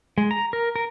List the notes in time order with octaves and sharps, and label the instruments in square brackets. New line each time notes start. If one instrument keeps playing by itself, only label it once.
[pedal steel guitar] G#3
A#5
A#4
A#4